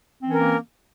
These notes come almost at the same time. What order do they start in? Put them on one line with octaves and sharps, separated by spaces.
C4 E3 C#4 A#4 A#3